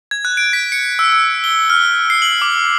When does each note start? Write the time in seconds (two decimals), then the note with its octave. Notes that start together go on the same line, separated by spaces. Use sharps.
0.11 G#6
0.25 F#6
0.37 D7
0.53 B6
0.72 C#7
0.99 E6
1.12 E6
1.44 G7
1.70 F6
2.10 C7
2.22 F#7
2.42 D6